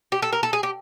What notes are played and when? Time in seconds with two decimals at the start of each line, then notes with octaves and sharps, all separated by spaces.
0.12 G4
0.22 A4
0.33 A#4
0.43 A4
0.53 G#4
0.63 G4